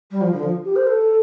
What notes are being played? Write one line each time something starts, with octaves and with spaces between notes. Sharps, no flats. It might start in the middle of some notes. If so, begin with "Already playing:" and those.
G3
F3
D3
F3
G4
C5
A4